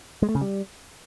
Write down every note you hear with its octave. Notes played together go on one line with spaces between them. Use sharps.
G#3
A3
C#3
G3